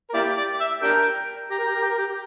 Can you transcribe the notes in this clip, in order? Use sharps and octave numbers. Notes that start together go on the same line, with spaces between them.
A#4
A#3 E4 G4 D5
D5
E5
D4 G4 A#4 G5
G4 A#5
A#4
G4
A#4
G4
A#4
G4